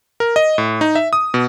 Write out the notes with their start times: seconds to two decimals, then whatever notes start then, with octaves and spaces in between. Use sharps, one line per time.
0.20 A#4
0.36 D#5
0.58 A2
0.81 D#4
0.95 E5
1.13 D#6
1.34 B2